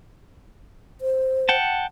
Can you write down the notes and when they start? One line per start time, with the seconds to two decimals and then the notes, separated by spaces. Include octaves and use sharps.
1.01 C5
1.49 F#5 G5 A5